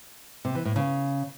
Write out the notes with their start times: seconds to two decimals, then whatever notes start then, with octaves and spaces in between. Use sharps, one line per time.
0.45 C3
0.55 E3
0.65 A2
0.76 C#3